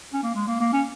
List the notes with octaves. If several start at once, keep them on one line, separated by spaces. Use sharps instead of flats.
C#4
A#3
G#3
A#3
A#3
C#4